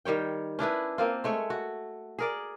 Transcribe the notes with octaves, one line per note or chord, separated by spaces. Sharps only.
D#3 G3 C#5 G5
C#4 D4 E4 B4
A#3 C4 F4
G#3 A3 C#5
F#4
G#4 A#4 D5